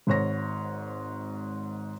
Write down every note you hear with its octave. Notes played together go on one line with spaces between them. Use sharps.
G#1 G#2 C#5 A#6